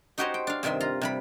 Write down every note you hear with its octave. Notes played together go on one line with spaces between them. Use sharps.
D#4 F#4 G4 C5 C#5 D#5
G5
D4 F5
G2 C3 D#3 E5 C6
F4 A#5
C3 G3 B5